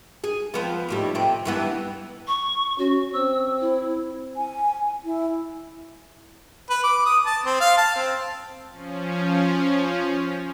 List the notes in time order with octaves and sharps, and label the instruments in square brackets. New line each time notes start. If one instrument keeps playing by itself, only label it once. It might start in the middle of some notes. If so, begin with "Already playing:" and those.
[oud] G#4
F3 B3 C4
D#2 A2 G3
C3 A3 C4
G2 E3 B3
[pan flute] C#6
[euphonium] C#4 [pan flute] F#4
[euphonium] C4 [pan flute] E6
[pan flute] E4
[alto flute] G#5
E4
[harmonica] B4
D6
D#6
A5
C4
F5
A5
C4
[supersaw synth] F3 C#4